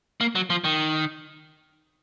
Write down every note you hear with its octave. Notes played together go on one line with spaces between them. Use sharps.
A#3
F#3
F3
D#3